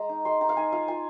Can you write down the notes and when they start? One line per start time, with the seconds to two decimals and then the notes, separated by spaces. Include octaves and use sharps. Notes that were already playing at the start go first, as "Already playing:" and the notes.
Already playing: G#3 A#5
0.09 D#4
0.25 G#3 C6
0.41 D#4 A#5
0.49 F5
0.57 D#4 G#5
0.72 F4 F5
0.88 F4 G#5